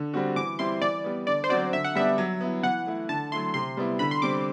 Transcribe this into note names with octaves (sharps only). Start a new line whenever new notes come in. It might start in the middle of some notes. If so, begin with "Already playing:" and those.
Already playing: D3
G3 C4 F#4
E3 D6
G3 C4 E4 C6
E3 D5
G3 B3
D3 D5
C5
F#3 C4 F#4 D5
D3 E5
F#5
G3 B3 D4 E5
F#3
B3 E4
E3 F#5
A3 E4
D3 A5
F#3 A3 E4 C6
C3 C6
G3 B3 E4
D3 B5
C6
G3 C4 D6